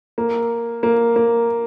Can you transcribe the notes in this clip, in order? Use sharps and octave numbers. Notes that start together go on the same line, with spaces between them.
A#3
A#3
A#3